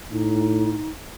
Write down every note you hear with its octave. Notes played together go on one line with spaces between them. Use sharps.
A2 D#4